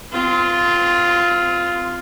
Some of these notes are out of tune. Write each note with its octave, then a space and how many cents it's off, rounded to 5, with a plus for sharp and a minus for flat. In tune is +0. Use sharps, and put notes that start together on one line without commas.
C4 -25 F4 +0